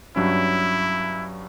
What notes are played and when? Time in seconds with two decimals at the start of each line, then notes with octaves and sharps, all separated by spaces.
0.16 G2 F#3 C#4 E4